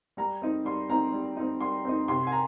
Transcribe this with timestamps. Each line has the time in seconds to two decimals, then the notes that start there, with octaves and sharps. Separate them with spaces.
0.17 G3 A#5
0.42 C4 D#4
0.65 G3 C6
0.89 C4 D#4 A#5
1.12 G3
1.37 C4 D#4
1.61 G3 C6
1.85 C4 D#4
2.08 C3 C6
2.27 G#5
2.32 A#5